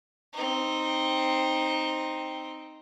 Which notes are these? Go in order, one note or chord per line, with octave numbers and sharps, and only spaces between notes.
C4 D#4